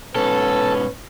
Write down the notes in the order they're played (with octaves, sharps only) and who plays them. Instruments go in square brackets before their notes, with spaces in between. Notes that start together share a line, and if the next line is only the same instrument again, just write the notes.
[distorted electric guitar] G#2 B2 [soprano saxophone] C#4 [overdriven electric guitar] A4 [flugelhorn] B4